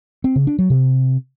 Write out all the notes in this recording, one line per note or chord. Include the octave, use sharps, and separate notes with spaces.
C4
C#3
D4
F#3
C3